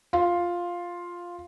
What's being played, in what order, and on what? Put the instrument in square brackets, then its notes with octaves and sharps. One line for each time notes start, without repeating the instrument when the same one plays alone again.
[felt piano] F4